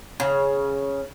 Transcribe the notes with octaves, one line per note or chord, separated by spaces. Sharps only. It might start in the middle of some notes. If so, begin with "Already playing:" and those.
C#3